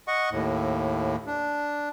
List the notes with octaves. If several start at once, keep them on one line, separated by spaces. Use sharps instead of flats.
D#5 F#5 C#6
D#2 A2
D4